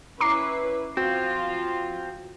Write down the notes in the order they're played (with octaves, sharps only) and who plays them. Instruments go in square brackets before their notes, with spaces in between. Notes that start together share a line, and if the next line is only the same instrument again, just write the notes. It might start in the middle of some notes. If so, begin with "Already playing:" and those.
[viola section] C#4 E4 B4 [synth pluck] A#5 D6 C7
[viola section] F3 F4 [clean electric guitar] C4 [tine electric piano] F#4